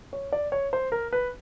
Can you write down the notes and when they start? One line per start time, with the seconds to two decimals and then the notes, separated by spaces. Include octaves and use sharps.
0.13 C#5
0.33 D5
0.52 C#5
0.73 C5
0.92 A#4
1.13 B4